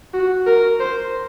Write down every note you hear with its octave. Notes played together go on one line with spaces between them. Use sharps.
F#4
A#4
C5